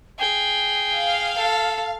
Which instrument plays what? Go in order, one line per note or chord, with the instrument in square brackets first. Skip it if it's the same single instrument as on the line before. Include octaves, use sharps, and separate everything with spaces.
[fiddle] G#4 [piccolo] G5
[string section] F5
[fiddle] A4